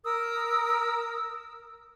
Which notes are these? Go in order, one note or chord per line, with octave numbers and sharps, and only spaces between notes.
A#4 D#6 E6